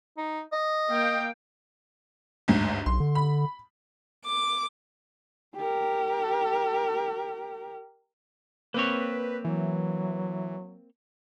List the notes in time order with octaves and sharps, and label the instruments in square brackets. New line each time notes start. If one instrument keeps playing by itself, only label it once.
[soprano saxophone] D#4
D#5
[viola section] A#3 F5 G5
[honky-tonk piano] G1 D2 G#2
[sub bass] B1 [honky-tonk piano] C6
[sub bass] D3
[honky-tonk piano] B5
[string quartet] D6
[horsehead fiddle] G4 A#4
[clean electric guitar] A#3 C4 C#5 [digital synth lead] B4
[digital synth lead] E3 [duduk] F#3